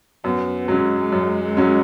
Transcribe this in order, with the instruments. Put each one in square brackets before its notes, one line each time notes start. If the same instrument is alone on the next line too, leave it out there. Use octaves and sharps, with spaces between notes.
[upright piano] F#2 [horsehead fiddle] B3
[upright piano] F#3 C#4 [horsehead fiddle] G#3
[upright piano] F#2
F#3 C#4